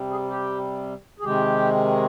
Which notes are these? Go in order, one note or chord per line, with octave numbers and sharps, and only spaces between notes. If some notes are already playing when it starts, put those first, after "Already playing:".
Already playing: C3 G3
G#4
G4
G#4
C3 D#3 G#3 G4